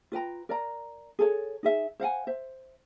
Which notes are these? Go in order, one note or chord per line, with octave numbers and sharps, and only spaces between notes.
F4 B4 G5 A#5
A#4 D5 A#5
G#4 A4 C#5
D#4 G#4 E5
C5 F5 F#5 G#5
C5 E5